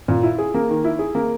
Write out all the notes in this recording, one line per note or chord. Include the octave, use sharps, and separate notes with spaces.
A#2
E4
G#4
A#3
D#3
E4
G#4
A#3